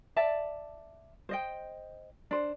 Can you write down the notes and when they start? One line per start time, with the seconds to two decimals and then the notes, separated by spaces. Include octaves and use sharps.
0.16 D5 E5 A5
1.29 C5 D#5 G5
2.31 D4 C5